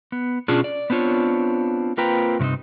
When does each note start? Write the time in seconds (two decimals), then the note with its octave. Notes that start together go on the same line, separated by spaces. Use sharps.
0.12 B3
0.48 B2 C#4 D4 F4 G#4
0.64 D5
0.90 B3 C4 D4 F4 C#5
1.97 A#3 C4 F4 B4 G5 A#5
2.39 G2 C3 A#3 C4 D#4